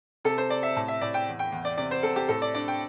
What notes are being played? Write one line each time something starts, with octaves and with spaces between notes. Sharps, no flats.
C3 A4
C5
C3 D5
E5
A2 A5
E5
A2 D5
G5
E2
G5
E2
D5
C3 D5
C5
C3 A4
G4
A2 A4
D5
D4 D5
G5